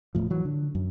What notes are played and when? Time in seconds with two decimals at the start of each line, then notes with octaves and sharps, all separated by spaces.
0.15 D#1 B1 A2 F3
0.30 E3 F#3
0.45 D3
0.75 F#2